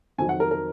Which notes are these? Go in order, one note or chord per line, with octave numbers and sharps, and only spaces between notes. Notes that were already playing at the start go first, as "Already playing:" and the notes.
F2 D#3 F#3 G#5
F#5
A#4
A#4